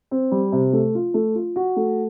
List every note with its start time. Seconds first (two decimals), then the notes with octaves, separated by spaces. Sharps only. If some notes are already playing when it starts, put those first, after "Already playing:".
0.11 C4
0.31 G3
0.52 C3
0.73 A3
0.95 F4
1.14 A3
1.35 F4
1.56 F#4
1.76 A3